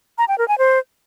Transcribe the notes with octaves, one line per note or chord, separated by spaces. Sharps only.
A#5
G5
A#4
G#5
C5